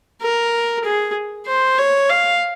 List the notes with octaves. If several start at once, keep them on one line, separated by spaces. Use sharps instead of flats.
A#4
G#4
C5
C#5
F5